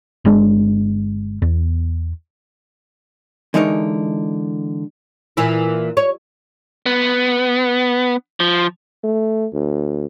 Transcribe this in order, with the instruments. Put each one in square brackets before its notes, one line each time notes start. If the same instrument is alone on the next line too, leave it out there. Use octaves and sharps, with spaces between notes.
[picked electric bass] G1 G#3 C#4 D4
E2
[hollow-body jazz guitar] D3 E3 G#3 D#4 A#4 C#5
[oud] A#2 E3 E4
C#5
[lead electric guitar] B3
F3
[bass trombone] A3
D2